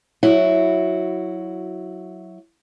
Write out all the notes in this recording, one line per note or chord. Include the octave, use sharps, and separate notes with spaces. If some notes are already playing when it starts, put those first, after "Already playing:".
F#3 E4 F#4